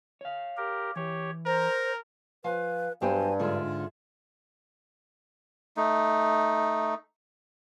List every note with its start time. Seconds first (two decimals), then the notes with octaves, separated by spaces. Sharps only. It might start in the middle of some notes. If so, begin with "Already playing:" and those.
0.21 C#5 F5
0.57 G4 A#4
0.96 E3 G4 C#5
1.46 A#4 C5 A#5
2.44 F3 B4 F5 G#5
3.02 G2 F#3 B3 D4 G4 C5 G#5
3.39 G#2 D3 F4 G#4 E5
5.77 A3 D#4